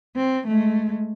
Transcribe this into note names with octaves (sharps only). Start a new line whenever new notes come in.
C4
G#3 A3